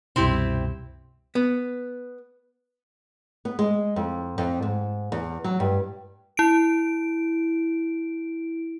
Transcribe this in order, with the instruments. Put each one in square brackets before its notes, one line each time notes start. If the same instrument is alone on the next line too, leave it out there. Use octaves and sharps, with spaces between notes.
[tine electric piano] C2 F#2 B2 [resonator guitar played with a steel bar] C4 E4 G4
[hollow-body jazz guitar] B3
[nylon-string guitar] B3
G#3
F2
F2
G#2
E2
F#3
G2
[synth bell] E4 D7